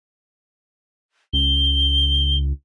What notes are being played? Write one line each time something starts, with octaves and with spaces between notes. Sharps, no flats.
C#2 G7